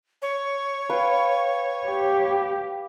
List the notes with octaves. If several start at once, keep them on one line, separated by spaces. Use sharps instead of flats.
C#5
B4 F5 G5
G4